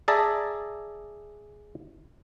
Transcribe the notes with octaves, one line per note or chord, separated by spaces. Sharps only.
G#4 D5 E5 A5 A#5